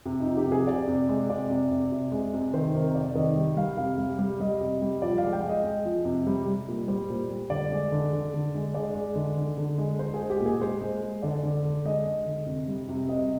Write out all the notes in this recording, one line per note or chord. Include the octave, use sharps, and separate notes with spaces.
C3
D#4
F3
G4
C3
G#4
C3 D5
C3
G#3
C3 D5
C3
C3
C3
G#3
C3
D#3 C5
C3 A#4
C3 D5
D#3 D#5
G3
G3 F5
C3 F5
G3
G3
G3 D#5
C3
G3
F3 D5
F5
G#3
G5
G#3
D#5
G#3
F3
C3
G3
G3
A#2
G3 C5
A#2
G3
D3 D5
G#3
D3
D3
D3
G#3
G#3 D5
G#3
D3
D3
D3
G#3
G#3 C5
G#4
G#3
G4
A#2
G#4
G#3 C5
G#3
G#3
D3 D5
D3
D3
G#3 D#5
G#3
D3
C3
G3
C3
C3 D#5